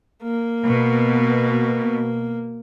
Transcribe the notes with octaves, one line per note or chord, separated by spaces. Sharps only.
A#3
B2